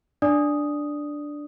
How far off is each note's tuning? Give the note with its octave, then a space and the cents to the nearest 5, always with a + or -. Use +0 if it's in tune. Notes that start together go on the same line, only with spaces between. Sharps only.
D4 +0 D5 +0 D#6 +0